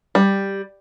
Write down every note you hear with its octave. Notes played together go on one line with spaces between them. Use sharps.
G3